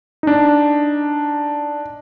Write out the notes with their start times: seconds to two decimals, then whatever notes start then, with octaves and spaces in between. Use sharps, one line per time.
0.23 D4 D#4